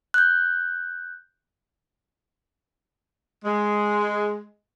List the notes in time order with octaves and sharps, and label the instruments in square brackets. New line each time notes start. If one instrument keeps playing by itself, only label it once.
[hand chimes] F#6 G6
[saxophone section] G#3